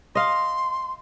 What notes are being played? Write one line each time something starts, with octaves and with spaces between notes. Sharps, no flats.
D#5 F5 C6